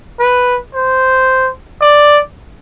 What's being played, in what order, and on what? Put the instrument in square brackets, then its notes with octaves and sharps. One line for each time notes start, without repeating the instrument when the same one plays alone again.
[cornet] B4
C5
D5